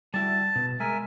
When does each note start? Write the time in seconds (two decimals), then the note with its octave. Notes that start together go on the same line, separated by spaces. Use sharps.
0.14 G3 E4 F#4 A5
0.56 B2
0.80 G#3 A#4 E5 G#5